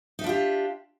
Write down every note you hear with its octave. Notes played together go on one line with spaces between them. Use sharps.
D4 D#4 F4 G4 E5